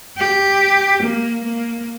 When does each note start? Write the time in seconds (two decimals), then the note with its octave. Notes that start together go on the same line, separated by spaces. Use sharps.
0.17 G4
1.02 A#3
1.44 A#3